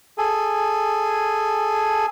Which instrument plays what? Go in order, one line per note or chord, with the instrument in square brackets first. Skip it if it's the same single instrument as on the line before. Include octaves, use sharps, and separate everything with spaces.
[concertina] G#4 A4